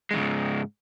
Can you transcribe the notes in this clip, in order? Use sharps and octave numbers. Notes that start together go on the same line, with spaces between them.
E2 G#2 C#3 G#3